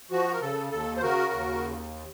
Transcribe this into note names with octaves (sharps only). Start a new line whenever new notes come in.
F3 F#4
A#4
C#3 A4
D#2 A4
C5
C#3 F#4 A#4
D#2